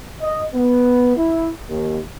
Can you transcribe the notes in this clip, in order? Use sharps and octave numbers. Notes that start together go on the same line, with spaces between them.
D#5
B3
E4
D#2